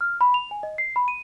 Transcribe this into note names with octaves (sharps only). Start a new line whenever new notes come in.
F6
B5
F7
G#5
D#5
C7
B5
D#7